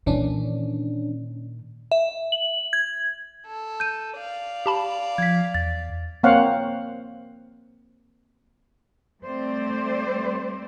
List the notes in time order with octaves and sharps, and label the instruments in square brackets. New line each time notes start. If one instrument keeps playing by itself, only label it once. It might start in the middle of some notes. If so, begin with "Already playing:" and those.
[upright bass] A#2 D#3 [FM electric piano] E3 C#4 D4
[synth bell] E5
F#7
G#6
[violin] A4
[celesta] G6 D#7
[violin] D5 F5
[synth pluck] G4 A5 B5
[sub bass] F3 [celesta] G#6 B6
[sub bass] E2 [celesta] A6
[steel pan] A#3 C4 C5 C#5 F5 F#5
[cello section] G3 A3 C4 C5 D5